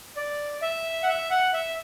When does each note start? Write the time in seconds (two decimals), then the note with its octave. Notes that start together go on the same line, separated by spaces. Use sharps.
0.16 D5
0.62 E5
1.03 F#5
1.08 E5
1.30 F#5
1.53 E5